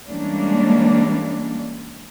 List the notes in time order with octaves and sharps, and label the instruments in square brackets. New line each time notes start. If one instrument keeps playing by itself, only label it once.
[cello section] E3 G3 G#3 A#3 C#4 D4